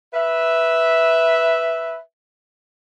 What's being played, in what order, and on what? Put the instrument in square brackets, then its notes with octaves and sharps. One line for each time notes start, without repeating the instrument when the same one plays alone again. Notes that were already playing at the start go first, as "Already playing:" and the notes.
[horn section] B4 E5